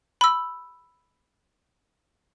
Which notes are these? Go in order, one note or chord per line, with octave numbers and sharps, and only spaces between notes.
B5 E6